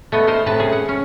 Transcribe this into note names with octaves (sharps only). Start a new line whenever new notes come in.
A3 B3 D#5
D#4 A#4 C5 D#5
A2 C3 B4 A5
C#4 G#4
C4 F#5
C#4